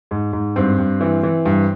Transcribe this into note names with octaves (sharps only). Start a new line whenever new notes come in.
G#2
G#2
G2 C4
G2
E3
E3
G2